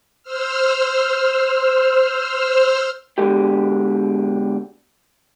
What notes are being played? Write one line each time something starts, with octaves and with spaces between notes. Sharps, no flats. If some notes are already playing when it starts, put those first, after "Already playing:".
C5 E6 F6
B2 D3 E3 G#3 A3 G4